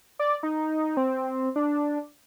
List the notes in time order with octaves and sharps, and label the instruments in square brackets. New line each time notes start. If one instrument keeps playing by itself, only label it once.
[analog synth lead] D5
D#4
C4
D4